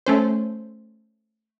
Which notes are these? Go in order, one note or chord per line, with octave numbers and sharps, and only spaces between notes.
A3 C#4 C5